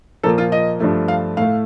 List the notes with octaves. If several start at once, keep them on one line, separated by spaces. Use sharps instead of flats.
A#2 F3 A#3 A4
F4
D#5
G2 F3 A3
F5
A2 A3 F5